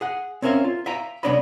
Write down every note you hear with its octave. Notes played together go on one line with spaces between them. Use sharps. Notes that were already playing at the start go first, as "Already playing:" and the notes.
G#4 F#5
C4 C#4 A#4 E5 F5
F4
E5 F5 G5 G#5 A#5
C2 B3 D4 C#5 D#5 B5